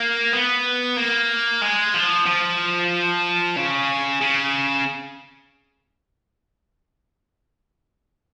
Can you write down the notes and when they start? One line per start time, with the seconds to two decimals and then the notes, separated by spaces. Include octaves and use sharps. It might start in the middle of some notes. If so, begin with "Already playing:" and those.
Already playing: A#3
0.33 B3
0.97 A#3
1.62 G#3
1.94 F3
2.27 F3
3.56 C#3
4.21 C#3